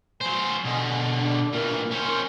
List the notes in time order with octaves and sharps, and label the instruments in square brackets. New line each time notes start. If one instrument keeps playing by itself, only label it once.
[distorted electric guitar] F#3 C5 [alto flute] G#5
[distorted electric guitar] B2 D3
[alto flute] D4
[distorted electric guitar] A#2 E3 [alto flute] A#4
[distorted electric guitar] C#4 C5